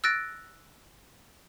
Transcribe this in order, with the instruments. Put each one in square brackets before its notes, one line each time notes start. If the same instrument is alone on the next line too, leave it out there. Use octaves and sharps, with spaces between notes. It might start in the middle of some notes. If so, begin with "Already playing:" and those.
[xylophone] E6 F#6 A6 A#6 D7